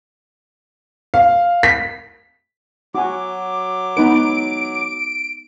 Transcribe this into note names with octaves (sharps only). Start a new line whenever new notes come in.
F5
B6
F#3 F#4 G#5 D6
B3 D#4 B4 D7